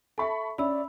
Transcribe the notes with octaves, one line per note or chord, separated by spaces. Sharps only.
A4 E5 A5 B5 C#6
C#4 D5 E5 B5 E6